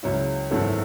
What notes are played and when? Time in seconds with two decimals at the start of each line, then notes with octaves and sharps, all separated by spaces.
0.03 C#2 C#3 F#3 C#4 E4
0.51 G#1 F#2 E3 A3 E4